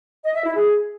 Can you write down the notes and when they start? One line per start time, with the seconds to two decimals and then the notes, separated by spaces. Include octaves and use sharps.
0.24 D#5
0.34 E5
0.44 E4
0.55 G#4